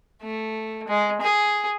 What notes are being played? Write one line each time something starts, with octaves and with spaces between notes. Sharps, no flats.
A3
G#3
G#4